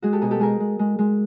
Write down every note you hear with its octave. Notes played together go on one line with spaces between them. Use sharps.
G#3 F#4 G#4
G4 A4
B2 G#4 A#4
G4 A4
G#3 G#4 A#4
G#3
G#3
G#3